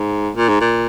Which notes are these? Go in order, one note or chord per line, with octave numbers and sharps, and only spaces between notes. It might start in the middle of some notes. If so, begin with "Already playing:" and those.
Already playing: G#2
A#2
G#2
A#2